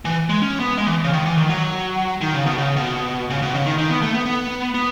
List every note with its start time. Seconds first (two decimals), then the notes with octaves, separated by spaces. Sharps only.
0.05 E3
0.29 G#3
0.42 C#4
0.60 B3
0.77 G#3
0.87 E3
1.04 C#3
1.13 D#3
1.25 E3
1.37 D#3
1.50 F#3
2.21 D#3
2.34 C#3
2.46 B2
2.58 C#3
2.76 B2
3.30 C#3
3.42 B2
3.54 C#3
3.66 D#3
3.78 D#3
3.90 B3
4.02 A3
4.14 B3
4.26 B3
4.75 B3